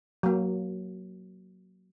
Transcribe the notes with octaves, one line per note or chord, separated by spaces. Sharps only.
F#3 A#3